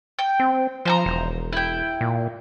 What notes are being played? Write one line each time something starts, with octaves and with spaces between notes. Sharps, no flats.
G5
C4
F3 C5 A5 A#5
E1
E4 G5
A#2